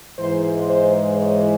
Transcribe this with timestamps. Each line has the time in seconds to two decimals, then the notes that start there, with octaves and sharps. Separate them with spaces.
0.18 G#2 E3 C5
0.68 C5
1.17 C#5